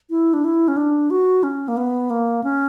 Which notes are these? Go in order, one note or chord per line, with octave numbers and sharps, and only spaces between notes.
E4
D4
E4
C#4
D4
F#4
C#4
A#3
B3
A#3
C#4